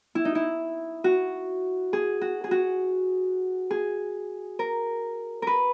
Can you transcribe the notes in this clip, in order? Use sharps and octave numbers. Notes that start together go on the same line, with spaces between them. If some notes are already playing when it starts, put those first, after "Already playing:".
E4
D#4
E4
F#4
G#4
F#4
G#4
F#4
G#4
A#4
A#4 B4